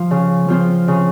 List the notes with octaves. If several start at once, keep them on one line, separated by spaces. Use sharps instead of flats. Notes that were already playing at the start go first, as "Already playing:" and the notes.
Already playing: F3 F4
C#3
F3 C4 F4 C5
C#3